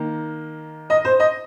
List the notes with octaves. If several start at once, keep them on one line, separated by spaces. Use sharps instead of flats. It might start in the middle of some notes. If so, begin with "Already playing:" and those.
Already playing: D#3 A#3
D#5
C5
D#5